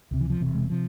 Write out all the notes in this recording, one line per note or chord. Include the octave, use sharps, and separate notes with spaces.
C#2 C3
E3
F3
E1 E2 C3
G#3
C3 F3